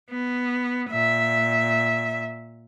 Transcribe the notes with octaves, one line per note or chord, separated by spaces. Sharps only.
B3
A#2 E5